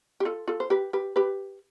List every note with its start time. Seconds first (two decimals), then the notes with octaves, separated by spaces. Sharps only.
0.20 G4
0.25 F4 A4
0.48 F4 A4
0.60 C5
0.70 G4 B4
0.93 G4 B4
1.16 G4 B4